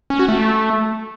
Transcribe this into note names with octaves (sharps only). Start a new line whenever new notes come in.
C#4
F#4
A3